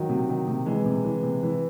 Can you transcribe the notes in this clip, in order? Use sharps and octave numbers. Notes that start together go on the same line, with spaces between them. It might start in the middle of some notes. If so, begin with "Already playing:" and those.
Already playing: D#3 F#3
C3
D#3
C3
E3 G#3
C3
E3
C3
E3